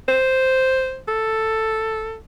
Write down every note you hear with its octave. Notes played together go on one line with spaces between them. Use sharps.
C5
A4